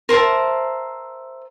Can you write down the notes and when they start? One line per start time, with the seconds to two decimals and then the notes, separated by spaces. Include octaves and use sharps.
0.09 A#4 C5 E5 A5